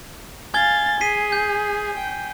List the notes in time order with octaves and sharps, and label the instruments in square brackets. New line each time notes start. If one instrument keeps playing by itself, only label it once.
[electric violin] F5 A6 [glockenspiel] G#5 G#6 G7
[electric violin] G#4 [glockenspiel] B6 C7 D#7
[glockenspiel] G6
[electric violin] G5